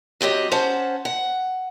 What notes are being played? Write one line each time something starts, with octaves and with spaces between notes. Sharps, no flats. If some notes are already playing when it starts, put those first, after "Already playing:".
F#3 C4 G4 D#5
C#4 C5 F#5 A5
F#5